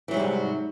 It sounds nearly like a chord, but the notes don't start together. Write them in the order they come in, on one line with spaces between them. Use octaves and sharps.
E3 F#3 G#2 G3 C3